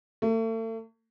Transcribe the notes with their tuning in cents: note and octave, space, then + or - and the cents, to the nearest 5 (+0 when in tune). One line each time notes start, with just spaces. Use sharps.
A3 +40